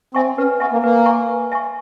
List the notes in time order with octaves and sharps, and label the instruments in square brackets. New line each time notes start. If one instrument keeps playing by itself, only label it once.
[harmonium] C4 [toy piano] E5 G#5 C#6
[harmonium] C#4 [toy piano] B4
[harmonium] B3 [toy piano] E5 G#5 C#6
[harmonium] A#3
[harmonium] A#3 [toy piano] B4
[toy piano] E5 G#5 C#6
B4
E5 G#5 C#6